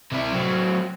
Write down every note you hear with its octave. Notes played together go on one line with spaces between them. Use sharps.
C3 E4
F#3 C4